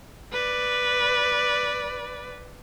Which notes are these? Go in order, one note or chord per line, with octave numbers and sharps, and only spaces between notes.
B4 D5